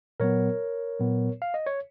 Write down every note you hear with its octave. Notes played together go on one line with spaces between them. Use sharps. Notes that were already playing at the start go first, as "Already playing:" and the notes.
A#2 F#3 B3 A#4 C#5
A#2 F#3 B3
F5
D#5
C#5